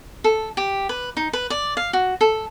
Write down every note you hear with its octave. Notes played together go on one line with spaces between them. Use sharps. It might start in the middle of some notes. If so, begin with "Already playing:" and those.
A4
G4
B4
D#4
B4
D5
F5
F#4
A4